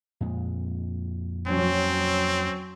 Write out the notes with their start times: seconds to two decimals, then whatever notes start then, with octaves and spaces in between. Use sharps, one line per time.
0.21 F2 A#2 G#3
1.47 F#3 C4 C#4